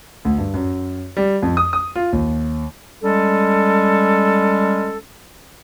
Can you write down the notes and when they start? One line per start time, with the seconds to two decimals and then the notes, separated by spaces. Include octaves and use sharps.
0.25 D2
0.38 G2
0.54 F#2
1.17 G3
1.43 F2
1.57 D#6
1.73 D#6
1.96 F4
2.13 D#2
3.03 G3 G#3 C#4 A4